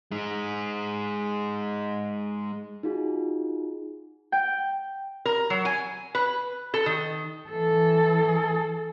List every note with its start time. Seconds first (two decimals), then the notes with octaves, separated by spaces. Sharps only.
0.11 G#3 D#4
2.83 D#4 F4 F#4 G#4
4.32 G5
5.25 A#4
5.50 F#3
5.65 G#5
6.15 B4
6.74 A4
6.86 D#3
7.50 E3 A4